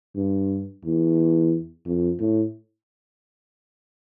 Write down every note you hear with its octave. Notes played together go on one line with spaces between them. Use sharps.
G2
E2
F2
A2